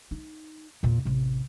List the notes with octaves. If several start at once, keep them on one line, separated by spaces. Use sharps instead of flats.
D#4
E2 A#2
A1 C3